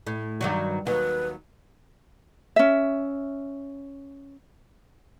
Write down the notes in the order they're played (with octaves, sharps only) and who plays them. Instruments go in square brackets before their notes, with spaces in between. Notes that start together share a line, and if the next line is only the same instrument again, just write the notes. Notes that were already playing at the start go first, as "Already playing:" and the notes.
[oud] A2
G2 D#3 F#3
[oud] D#2 F#3 [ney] B4
[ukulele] C#4 E5